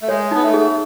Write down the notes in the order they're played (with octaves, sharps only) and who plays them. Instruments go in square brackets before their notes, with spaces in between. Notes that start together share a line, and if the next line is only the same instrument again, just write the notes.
[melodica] A3
[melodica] G#3 [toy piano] C#5
[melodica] B3 [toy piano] D#4
[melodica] A3
[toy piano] G#4